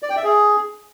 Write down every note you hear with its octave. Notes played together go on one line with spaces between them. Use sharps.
D5
G5
E5
G#4